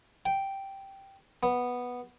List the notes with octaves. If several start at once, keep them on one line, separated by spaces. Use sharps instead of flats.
G5
B3